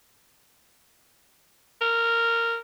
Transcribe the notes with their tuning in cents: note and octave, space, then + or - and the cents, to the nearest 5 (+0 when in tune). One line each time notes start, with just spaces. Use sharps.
A#4 -10